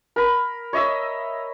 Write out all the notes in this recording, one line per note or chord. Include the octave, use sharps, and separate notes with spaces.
A#4 B5
C#5 D#5 E5 E6